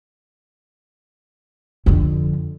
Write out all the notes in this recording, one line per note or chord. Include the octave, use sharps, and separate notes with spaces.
F2 D3